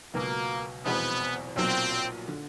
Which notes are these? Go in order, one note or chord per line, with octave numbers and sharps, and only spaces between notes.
C#2 B2 F#3 A#3 B3
F1 E2 B2 G#3 B3 C4
B1 A#2 F#3 C4
D3